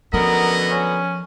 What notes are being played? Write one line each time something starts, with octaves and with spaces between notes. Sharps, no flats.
F#2 D3 F3 B3 A#4 D#5
C#4